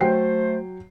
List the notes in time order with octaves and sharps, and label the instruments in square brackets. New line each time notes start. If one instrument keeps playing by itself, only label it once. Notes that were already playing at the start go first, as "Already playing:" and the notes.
[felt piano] F#3 G5 C7 [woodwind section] A3 C5